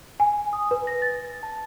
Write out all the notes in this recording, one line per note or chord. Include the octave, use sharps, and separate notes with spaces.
G#5
D#6
B4
A#6
A6
A5